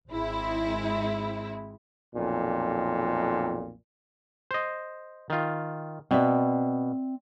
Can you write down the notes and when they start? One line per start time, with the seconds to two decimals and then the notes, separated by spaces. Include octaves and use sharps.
0.10 G#1 G#3 C4 E4
2.15 B1 F2 A#2
4.51 C5 D#5
5.30 D#3 F4
6.11 B2 C4 D5 E5